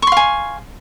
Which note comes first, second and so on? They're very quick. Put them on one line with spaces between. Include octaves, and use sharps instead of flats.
C#6 C6 F5 G#5